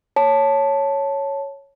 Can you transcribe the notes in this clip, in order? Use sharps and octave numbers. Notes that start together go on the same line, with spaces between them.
C#5 A5